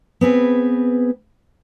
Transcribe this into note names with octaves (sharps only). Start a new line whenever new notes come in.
B3 C4 G#4 B4